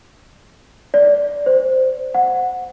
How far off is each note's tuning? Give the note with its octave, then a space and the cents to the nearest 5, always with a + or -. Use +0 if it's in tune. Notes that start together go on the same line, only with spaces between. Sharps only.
D5 -15
C5 -10
F#5 -10